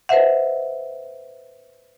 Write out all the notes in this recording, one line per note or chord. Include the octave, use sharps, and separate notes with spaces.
B4 C5 D#5 E5 F#5